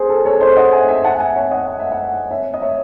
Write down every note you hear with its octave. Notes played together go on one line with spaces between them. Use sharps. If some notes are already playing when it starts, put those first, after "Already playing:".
Already playing: G#4 C5
A4
A4 C#5
C5 D#5
D#5 F#5
E5 G#5
E5 G#5
F#5 A5
F#5
E5 G#5
C#5 E5
D#5 F#5
F#5
E5
D#5 F#5
C#5 E5
D#5
C#5 E5